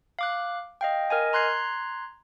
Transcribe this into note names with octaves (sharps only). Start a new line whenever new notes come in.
F5 D6 F#6
D#5 F5 G5
A#4 D#5 G#5
A#5 C6 F#6 G#6 C7